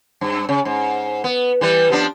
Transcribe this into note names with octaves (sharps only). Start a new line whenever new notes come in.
G2
C#3
G#2
B3
E3 G3 B4
F3 B3 D4